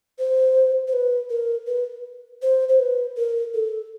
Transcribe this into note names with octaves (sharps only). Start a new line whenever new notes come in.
C5
C5
B4
A#4
B4
C5
C5
B4
A#4
A4